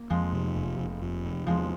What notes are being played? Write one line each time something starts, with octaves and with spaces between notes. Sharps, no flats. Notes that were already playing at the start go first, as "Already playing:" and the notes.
Already playing: A#3
F2 F3 G#3
C3
F1
F1
F2
C3
E2 F3 G#3